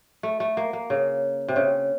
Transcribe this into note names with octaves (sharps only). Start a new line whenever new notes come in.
A3
A3
A#3
A#3
C#3
C3
C#3